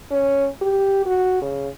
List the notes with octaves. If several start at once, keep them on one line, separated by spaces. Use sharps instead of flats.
C#4
G4
F#4
C#3